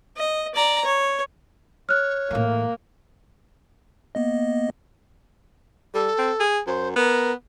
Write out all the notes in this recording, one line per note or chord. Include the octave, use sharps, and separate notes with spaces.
D#5
D5 A#5
C#5
C#5 F6 F#6
A2 E3 A#3
A#3 B3 D#5
G3 A4
C4
G#4
F#2 C5
B3 A#4